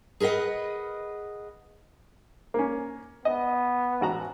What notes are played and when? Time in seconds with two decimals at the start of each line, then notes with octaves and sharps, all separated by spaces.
0.20 G#4 A#4 B4 D#5 F#5
2.54 A#3 C#4
3.25 B3 D#5
4.01 A1 F#4 A#5